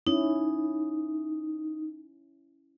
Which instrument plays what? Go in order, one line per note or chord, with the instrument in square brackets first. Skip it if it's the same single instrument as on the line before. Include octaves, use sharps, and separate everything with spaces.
[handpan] C#4 E4 [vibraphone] D#4